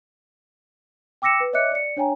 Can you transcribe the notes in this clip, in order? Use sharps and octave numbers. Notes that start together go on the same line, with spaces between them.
G5 D6 E6 A#6 C#7 E7
B4
C#5 D#5 E5 D6 F#6 C#7
D5 C#7
D4 C#5 G5 G#5 A#5